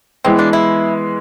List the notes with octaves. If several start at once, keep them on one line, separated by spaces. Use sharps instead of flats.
E3 G#3 B3 C4
D4
E4